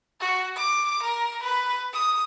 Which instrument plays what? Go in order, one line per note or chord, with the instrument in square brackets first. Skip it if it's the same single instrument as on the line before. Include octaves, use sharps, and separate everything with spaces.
[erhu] F#4
D6
A#4
B4
D#6